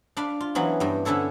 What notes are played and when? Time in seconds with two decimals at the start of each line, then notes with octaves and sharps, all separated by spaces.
0.17 D4 D5 F5 B5
0.40 F4
0.55 E3 F#3 B3 C#4
0.80 G2 G3
1.05 D3 C#4 E4 A4 C#5